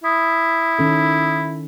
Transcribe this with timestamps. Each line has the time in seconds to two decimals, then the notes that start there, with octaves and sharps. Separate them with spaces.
0.04 E4 D#6
0.79 D#3 C#4 A4